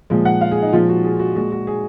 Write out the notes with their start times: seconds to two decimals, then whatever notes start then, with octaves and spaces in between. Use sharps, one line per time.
0.10 A#2 F3 G#3
0.25 F#5
0.41 F5
0.51 G#4
0.62 D#4
0.73 A#2 F3 G#3 F4
0.89 F#4
1.04 G#4
1.19 F#4
1.36 A#2 G#3 F#4
1.52 F#4
1.67 G#4